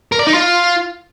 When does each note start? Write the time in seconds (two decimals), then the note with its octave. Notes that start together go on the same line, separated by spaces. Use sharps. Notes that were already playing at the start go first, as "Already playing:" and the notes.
0.12 A#4
0.19 D5
0.27 D#4
0.34 F4